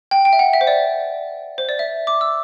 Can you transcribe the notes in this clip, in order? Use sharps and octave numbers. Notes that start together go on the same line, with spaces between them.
G5
G5
E5
F#5
E5
C5
D5
C5
D5
E5
D6
E6